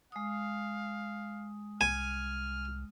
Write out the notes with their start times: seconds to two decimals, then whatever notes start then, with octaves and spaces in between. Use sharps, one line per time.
0.12 G#3 F5 D#6
1.81 C2 G#5 F6